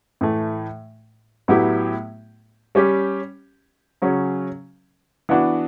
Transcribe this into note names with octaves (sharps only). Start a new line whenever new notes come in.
A2 E3 A3
A2 F#3 B3 E4 G4
G3 C#4 G4
C#3 F#3 C#4
E3 B3 D4 F#4